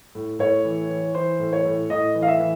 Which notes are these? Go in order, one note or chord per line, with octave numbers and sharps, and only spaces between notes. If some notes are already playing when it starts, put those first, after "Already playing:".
A2
A2 C#5
E3
E3
E3 C5
A2
C#5
A2
A2 D#5
E3
F5
E5
E3